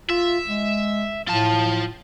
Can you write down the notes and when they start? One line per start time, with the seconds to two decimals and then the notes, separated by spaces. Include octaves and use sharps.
0.10 F4 E5
0.48 G#3
1.29 A2 F4 A5